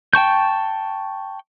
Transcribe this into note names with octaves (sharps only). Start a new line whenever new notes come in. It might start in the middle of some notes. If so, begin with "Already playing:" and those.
G5 A5 C#6 G6